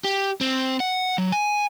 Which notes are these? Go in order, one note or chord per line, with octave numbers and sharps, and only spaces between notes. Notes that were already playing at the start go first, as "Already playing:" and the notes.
G4
C4
F#5
F#3
G#5